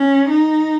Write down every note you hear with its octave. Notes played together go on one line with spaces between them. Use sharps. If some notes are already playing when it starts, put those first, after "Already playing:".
Already playing: C#4
D#4